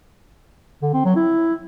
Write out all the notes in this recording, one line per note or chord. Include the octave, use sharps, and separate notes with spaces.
D3
C4
F#3
E4